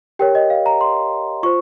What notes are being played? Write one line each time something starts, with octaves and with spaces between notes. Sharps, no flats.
G4 A#4 C#5 G5
D#5
F5
A#5
C6
F4 C5 C#6